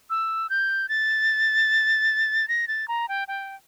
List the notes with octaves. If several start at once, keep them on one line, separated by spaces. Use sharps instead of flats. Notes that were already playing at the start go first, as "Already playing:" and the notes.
E6
G6
A6
A#6
A6
A#5
G5
G5